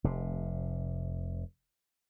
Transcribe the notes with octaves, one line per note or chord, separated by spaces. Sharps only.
F1 C3